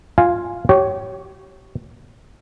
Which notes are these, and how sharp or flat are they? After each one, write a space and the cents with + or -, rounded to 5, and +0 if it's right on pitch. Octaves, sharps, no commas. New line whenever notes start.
F4 +0 F5 +0 G#5 +0
G4 -30 C#5 +0